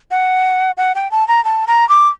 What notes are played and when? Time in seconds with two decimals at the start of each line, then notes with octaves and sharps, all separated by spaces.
0.11 F#5
0.77 F#5
0.95 G5
1.11 A5
1.28 A#5
1.45 A5
1.67 A#5
1.89 D6